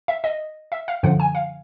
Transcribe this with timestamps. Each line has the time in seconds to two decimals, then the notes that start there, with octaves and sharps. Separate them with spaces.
0.08 E5
0.24 D#5
0.72 E5
0.88 F5
1.03 F#2 D3 F3 F#5
1.20 G#5
1.35 F5